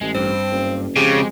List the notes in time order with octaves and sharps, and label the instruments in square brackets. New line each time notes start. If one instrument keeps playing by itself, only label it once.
[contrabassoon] A1 [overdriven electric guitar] G#3
[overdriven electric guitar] G2 [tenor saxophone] C4
[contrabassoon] F#1
[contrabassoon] F2 [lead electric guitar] C#3 [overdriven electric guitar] G#3 [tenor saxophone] G4